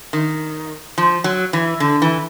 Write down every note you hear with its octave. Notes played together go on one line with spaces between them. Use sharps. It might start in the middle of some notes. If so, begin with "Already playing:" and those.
D#3
F3
F#3
E3
D3
E3